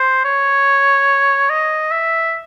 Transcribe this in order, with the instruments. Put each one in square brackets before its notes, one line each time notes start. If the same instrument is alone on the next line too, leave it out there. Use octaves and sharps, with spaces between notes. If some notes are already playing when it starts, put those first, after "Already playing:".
Already playing: [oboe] C5
C#5
D#5
E5